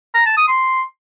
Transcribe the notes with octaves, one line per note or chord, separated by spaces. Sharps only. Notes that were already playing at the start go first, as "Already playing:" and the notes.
A#5
A5
D#6
C6